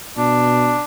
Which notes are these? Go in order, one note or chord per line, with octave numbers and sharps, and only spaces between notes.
B2 D4